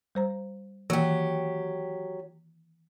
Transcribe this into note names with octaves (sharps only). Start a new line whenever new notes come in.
G3 C5 A#5
D#3 E3 F#3 A#3 G4